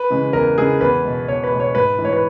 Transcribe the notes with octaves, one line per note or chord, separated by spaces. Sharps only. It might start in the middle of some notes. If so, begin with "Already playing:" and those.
Already playing: B4
C#3 E3 G#3
E2 A#4
C#3 E3 G#3 G#4
E2 B4
B2 G#3
E2 C#5
B4
B2 G#3
C#5
G#2 B4
E3
G#3 C#5
B4